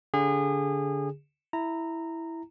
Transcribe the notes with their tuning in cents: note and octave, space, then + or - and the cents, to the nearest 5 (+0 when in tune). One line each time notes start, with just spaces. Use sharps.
D3 -30 G#4 -30
E4 +0 A#5 -15